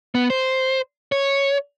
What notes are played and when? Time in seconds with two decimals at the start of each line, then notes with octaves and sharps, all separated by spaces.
0.15 B3
0.30 C5
1.12 C#5